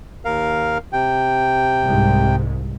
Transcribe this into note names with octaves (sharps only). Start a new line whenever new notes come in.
D#2 A#4 F5
C3 G5
C2 G#2